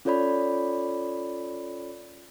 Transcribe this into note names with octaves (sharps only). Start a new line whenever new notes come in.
C#4 F4 A4 C#5 D5 B5